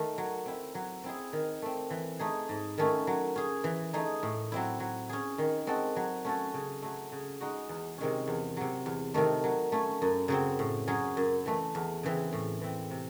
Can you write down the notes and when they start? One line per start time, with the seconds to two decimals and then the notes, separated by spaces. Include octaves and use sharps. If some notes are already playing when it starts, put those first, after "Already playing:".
Already playing: D#3 A3
0.18 F#3
0.46 C4 E4
0.75 F#3
1.04 C4 E4 G#4
1.33 D#3
1.62 A3 C4
1.90 E3
2.19 A3 D#4 G#4
2.49 G#2
2.78 D#3 A3 C#4 E4
3.07 F#3
3.36 C#4 G#4
3.64 E3
3.93 A3 D#4 G#4
4.23 A2
4.52 F#3 C4 E4
4.80 F#3
5.09 C#4 G#4
5.38 D#3
5.67 G#3 C4 F#4 A4
5.96 F#3
6.25 A3 C#4 F#4 A4
6.54 C#3
6.82 F#3 A3
7.12 C#3
7.41 G#3 D#4 F#4
7.69 E2
7.98 C3 D#3 G#3 C#4
8.28 E2
8.57 C3 F#3
8.86 E2
9.14 C3 D#3 A3
9.44 F#3
9.72 A3 C#4
10.02 F#2
10.28 C#3 F#3 C4
10.59 A2
10.88 F#3 C#4 G#4
11.17 F#2
11.46 E3 A3
11.75 E2
12.03 C#3 E3 C4
12.33 A2
12.62 E3 C4
12.91 C3